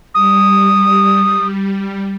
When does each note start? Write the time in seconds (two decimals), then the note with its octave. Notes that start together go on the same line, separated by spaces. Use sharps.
0.14 G3 D#6